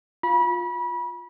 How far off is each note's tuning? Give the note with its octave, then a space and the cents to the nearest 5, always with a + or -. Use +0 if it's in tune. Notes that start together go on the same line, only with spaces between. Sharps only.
F4 +10 B5 -30